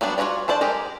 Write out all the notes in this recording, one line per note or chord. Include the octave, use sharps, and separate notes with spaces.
F#3 G3 B3 D4
F4 F#4 A#4 C#5 D5
D4 A4 C5 D5 A5
G#3 G4 G#4 A#4